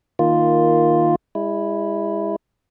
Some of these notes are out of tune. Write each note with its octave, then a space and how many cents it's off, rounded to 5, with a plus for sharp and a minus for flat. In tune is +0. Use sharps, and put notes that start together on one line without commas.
D#3 +5 A#3 +0 F4 +0
G#3 -40 E4 +0